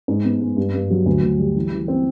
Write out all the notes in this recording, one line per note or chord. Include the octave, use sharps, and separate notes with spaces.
G#2
B3
G#3
G2
G2
F#3
D2
D2
G3
E3
E3
C4